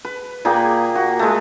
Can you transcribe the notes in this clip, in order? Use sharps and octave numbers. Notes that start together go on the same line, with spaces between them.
B4
A#2 A#3 G#4 G5
F#4
G#3 A3